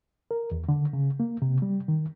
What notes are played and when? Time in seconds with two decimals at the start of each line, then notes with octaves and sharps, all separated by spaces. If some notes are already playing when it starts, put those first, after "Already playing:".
0.31 A#4
0.51 E2
0.69 D3
0.93 C#3
1.20 A#3
1.42 C3
1.62 G3
1.88 D#3